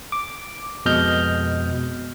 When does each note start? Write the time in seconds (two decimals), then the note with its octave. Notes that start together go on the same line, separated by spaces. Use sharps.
0.12 D6
0.85 F2 B2 G#3 D#5 F6 G6